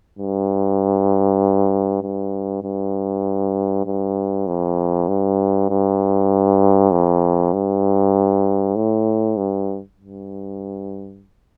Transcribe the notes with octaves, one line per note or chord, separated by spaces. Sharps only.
G2
G2
G2
G2
F2
G2
G2
F2
G2
A2
G2
G2